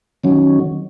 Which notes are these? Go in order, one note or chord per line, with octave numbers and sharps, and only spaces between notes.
D#3 F#3 C#4